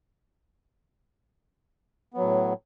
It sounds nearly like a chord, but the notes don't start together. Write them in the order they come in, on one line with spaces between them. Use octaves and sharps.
B3 F#3 A2